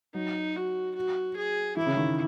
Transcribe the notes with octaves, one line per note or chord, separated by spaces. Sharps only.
F#3 D#4
F#4
F#4
G#4
E3 E4
C#3
D#3